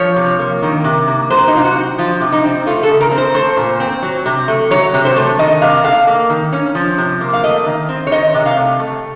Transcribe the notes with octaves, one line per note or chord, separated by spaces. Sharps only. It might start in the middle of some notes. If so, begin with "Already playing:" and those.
Already playing: F3 C#5
C3
A#3
D#3
C3
A#3
F#3 C5
D#4
C3 F4
F#4
C4
F3 F4
C3
D#4
C4
A3 F4
A4
C#3
A#4
C4
C5
A3 C5
A#2
C4
F#3
C3
A3
F#3 C#5
C3
C5
A3
D#3 D#5
C3 F5
A3 F5
A#3
D#3
C#4
F3
C3
A#3
F5
A3 D#5
D#3
C4
C#5
D#3 D#5
C3
F5
A3
A3